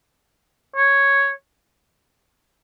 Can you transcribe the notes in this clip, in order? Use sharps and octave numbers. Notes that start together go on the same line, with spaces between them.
C#5